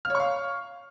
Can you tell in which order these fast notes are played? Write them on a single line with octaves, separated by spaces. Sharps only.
F6 C#5 C#6 F5